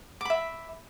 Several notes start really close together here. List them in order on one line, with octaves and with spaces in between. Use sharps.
D6 B5 E5